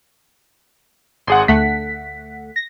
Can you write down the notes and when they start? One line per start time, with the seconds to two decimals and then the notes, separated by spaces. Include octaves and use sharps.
1.27 G#1 G#4 F#5 C6
1.48 D2 A3 F#5 B6
2.56 A#6